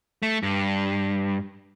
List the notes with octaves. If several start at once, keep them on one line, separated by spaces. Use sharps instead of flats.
A3
G2